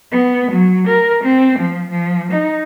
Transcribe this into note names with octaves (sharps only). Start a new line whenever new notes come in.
B3
F#3
A#4
C4
F3
F3
D#4